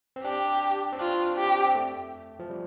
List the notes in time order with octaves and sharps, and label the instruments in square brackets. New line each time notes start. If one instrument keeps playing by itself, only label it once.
[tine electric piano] C4
[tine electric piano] D4 [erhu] G4
[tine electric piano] C4
[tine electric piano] D4 [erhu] F4
[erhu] G4
[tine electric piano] C4
A3
F3
G3